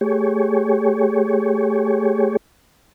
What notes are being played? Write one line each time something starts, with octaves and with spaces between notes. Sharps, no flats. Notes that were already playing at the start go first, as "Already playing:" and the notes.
A3 G4 G#4 C#5